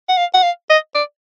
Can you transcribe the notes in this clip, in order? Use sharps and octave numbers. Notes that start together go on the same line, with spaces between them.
F#5
F5
F#5
F5
D#5
D5